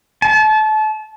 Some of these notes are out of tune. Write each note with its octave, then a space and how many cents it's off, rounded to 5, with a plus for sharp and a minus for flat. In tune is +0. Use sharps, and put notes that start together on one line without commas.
A5 -30